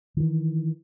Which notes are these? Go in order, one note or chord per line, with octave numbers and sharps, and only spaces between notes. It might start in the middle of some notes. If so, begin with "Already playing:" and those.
D#3 E3